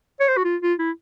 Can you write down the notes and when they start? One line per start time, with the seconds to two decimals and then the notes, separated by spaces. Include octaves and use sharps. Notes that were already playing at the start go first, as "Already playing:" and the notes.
0.20 C#5
0.28 C5
0.37 F#4
0.45 F4
0.62 F4
0.79 E4